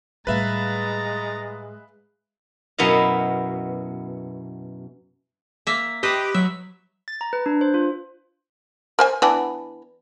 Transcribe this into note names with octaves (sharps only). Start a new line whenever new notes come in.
A2 G3 G#3 B4 E5 F5 A#5 A6
F#2 B2 B3 E4 D#5 F5
A#3 E5
G4 B4 C5 D#5
F#3 E5
A6
A#5
B4
D4
C5
F4
A#4 C5 G#5
E3 B3 D4